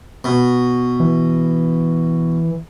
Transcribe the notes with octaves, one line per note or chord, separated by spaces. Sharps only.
B2
E3